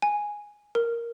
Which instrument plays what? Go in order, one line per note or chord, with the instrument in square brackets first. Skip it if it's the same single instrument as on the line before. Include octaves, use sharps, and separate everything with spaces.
[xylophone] G#5
A#4